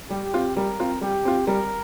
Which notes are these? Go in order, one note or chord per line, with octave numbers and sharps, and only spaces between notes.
G3 G4
C4 F4
G3 A#4
C4 F4
G3 G4
C4 F4
G3 A#4